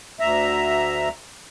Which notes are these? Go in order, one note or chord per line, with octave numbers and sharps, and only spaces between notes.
D2 E5 A#5